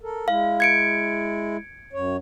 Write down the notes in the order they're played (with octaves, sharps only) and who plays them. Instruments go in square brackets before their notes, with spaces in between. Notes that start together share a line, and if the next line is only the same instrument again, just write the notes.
[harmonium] A4 A#4
[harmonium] G#3 E4 [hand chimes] F5
[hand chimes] G#6 C#7 D7
[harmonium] F#2 C#5